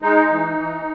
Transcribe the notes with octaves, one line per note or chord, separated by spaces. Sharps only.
G#3 D#4
E3
E3